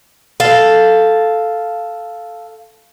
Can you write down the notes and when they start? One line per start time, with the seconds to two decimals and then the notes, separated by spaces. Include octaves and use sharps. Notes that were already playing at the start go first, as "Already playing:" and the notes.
0.40 A4 F5